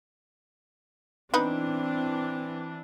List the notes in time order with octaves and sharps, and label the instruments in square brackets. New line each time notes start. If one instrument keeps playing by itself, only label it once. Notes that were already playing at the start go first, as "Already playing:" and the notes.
[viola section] E3 D4 [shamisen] B3 D#4 B4 [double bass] C4